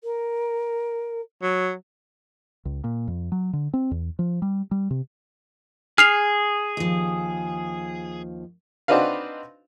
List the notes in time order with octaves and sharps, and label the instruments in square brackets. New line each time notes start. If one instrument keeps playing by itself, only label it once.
[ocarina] A#4
[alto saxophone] F#3
[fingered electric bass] C#2
A#2
F2
F#3
D3
C4
E2
F3
G3
G3
C3
[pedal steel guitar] G#4 [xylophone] F6 C7 F7
[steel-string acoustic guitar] D#2 F3
[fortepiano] C4 D4 D#4 F#4 B4 F5